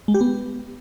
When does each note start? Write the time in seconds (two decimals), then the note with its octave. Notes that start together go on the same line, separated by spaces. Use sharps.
0.08 G#3
0.14 G4
0.21 B3